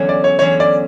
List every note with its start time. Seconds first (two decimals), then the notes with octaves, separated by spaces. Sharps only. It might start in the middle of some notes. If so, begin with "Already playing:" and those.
Already playing: E2 D3 F#3 C#4
0.09 D5
0.24 C#5
0.39 E2 D3 F#3 C#4 C#5
0.60 D5